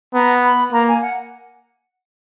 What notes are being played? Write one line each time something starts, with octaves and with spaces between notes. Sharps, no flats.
B3 A#5
B5
A#3 A#5
G#5
F#5